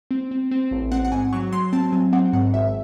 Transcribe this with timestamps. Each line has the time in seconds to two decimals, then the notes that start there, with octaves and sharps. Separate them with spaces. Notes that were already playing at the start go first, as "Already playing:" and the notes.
0.11 C4
0.31 C4
0.51 C4
0.71 A1
0.92 C4 F#5
1.05 F#5
1.12 G#2 G#5
1.33 F#3 C#6
1.52 F#3 C6
1.73 C4 A5
1.92 F#3 G#5
2.13 C4 F#5
2.33 G#2 F#5
2.53 G#1 E5